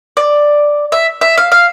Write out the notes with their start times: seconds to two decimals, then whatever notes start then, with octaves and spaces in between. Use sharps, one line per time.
0.17 D5
0.92 E5
1.21 E5
1.38 F5
1.52 F5